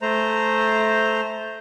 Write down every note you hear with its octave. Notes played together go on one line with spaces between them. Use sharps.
A3 C5 A#5